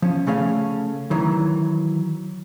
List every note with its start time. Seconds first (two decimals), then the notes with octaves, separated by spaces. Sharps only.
0.02 F3 C#4
0.27 C#3 A3 C#4 F5
1.11 D#3 E3 F#3